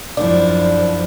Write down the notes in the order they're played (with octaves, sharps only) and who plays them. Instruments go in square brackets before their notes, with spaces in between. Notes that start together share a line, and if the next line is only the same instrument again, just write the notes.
[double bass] F#2 F3 [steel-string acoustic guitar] D4 E4 [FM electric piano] D5